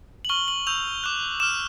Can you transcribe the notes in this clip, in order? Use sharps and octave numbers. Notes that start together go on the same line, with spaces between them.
F#7
C#6 F6 G7
F#7
C#6 E6 G6 F7
D6 F#6
D6 F6 E7